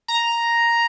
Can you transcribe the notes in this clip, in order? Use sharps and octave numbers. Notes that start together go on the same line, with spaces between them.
A#5